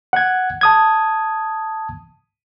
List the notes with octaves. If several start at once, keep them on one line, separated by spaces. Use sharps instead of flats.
F#5 G#6
A5 D#6 G#6